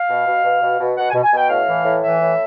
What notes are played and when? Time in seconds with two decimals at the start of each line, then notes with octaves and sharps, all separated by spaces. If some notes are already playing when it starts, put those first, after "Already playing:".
Already playing: F5
0.10 B2
0.27 B2
0.44 B2
0.62 B2
0.80 B2
0.97 B2 F#5
1.10 G#5
1.15 B2
1.23 G#5
1.32 B2 G5
1.50 A2 F5
1.68 E3
1.85 A2
2.03 E3 E5
2.21 A2